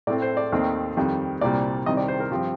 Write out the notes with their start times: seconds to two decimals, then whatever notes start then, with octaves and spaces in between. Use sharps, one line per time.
0.07 A2 A3 C4 D5
0.22 C5
0.37 D5
0.52 D#2 D#3 A3 C4
0.97 F2 D#3 G3
1.41 C2 A#2 G3 D5
1.86 C2 C3 D#3 G3 D#5
1.97 D5
2.08 C5
2.20 A#4
2.31 G2 F3 C4 G4